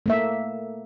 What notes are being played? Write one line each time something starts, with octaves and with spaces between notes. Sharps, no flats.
A3 A#3 E5